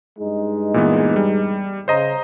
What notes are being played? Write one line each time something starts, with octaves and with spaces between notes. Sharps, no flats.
G2 G#3 D#4
A#2 E3 B3
G3
C#3 C5 D#5 A#5